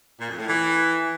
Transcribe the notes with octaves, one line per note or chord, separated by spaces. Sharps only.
A#2
F2
A2
E3